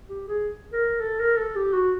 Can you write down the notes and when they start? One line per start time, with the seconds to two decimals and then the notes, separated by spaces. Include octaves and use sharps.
0.09 G4
0.28 G#4
0.73 A#4
1.00 A4
1.20 A#4
1.37 A4
1.56 G4
1.73 F#4